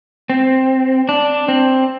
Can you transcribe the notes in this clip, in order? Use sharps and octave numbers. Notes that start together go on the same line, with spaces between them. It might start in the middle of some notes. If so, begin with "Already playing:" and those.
C4
D4
C4